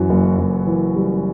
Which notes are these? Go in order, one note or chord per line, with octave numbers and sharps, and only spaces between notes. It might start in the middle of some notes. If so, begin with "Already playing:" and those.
Already playing: F#2 E3 F#4
F#1
F#1
E3
G3